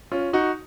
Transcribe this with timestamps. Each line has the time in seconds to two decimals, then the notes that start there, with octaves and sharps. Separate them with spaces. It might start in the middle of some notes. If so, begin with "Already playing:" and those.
0.12 C#4 F4
0.33 D#4 F#4